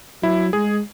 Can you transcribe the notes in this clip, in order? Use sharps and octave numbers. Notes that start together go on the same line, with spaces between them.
F#3 E4
G#3 G#4